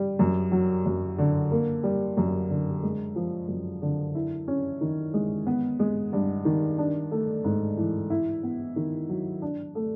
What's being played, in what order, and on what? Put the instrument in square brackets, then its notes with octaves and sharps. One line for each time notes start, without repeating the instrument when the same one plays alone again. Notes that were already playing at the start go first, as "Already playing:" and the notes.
Already playing: [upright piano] G3
F#2
F#3
F#2
D3
A#3
G3
F#2
D3
G#3
F3
F#2
D3
E4
C#4
D#3
G#3
B3
G#3
G2
D#3
D4
A3
G#2
E3
E4
B3
D#3
F#3
D4
A3